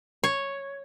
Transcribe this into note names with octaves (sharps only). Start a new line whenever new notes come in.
C#5